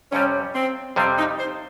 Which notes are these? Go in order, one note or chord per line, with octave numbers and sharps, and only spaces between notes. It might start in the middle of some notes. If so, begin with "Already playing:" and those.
F2 C3 G3 C#4
C4
F2 C3 G3 C4
D#4
C5